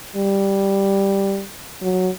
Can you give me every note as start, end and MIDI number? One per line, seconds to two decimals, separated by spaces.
0.16 1.43 55
1.82 2.09 54